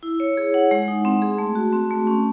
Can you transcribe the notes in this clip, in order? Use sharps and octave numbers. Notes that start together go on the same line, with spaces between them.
E4
C#5
G#4
F#5
G#3
D#4
C4
G#4
A3
F#4
C4
A3
C#4